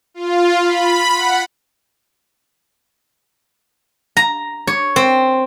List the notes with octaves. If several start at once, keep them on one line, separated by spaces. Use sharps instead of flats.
F4
B5
F#5
A#5
C#5
C4